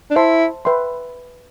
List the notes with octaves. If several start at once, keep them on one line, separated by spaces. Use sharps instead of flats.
D4
E4 C5 E5 A5 C6
B4 E5 G5 C6